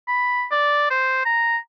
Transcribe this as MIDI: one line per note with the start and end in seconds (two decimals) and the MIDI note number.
0.08 0.45 83
0.52 0.89 74
0.91 1.22 72
1.25 1.57 82